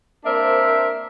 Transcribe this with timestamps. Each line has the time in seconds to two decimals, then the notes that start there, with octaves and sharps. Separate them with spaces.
0.25 A#3 C4 D4 A#4 C5 E5